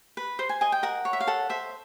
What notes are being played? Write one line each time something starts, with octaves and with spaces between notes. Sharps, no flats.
B4
C5 C6
G#5
D#5 G#5
G5
A#4 F#5
C#5
E5
F5
A4 F#5
C5 E5